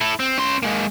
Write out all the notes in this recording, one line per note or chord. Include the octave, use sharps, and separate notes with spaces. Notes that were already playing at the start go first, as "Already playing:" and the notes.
E4 A4
C4
C#4 C6
G#3 A#3